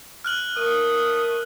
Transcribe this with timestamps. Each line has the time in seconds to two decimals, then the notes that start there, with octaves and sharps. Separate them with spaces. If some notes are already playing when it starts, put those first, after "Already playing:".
0.25 F6 F#6 F#7
0.57 A3 A#4 D#6